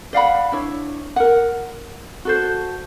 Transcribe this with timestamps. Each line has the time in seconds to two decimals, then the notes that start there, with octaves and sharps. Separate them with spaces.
0.13 D5 F5 F#5 B5
0.52 D4 E4 C#5
1.16 A#4 F#5
2.25 F#4 A4 C5